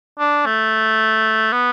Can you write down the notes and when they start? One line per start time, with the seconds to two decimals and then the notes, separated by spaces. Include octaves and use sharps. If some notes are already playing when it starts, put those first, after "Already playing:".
0.19 D4
0.46 A3
1.53 B3